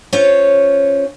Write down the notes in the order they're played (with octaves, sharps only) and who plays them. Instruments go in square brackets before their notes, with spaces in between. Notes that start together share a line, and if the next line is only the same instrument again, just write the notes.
[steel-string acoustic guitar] C#4 F4 C5 C#5